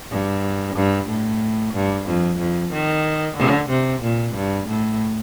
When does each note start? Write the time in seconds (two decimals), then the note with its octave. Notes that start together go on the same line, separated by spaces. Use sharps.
0.11 G2
0.76 G2
1.08 A2
1.74 G2
2.07 F2
2.39 F2
2.72 D#3
3.36 D3
3.69 C3
4.02 A#2
4.34 G2
4.68 A2